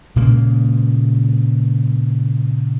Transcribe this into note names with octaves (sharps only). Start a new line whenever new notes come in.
A#2 C#3 G#3 A#3